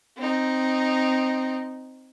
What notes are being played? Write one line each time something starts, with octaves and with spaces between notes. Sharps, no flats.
C4 D#4